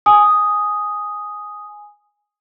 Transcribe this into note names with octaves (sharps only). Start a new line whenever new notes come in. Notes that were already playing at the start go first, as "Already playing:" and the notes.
G#5 D#6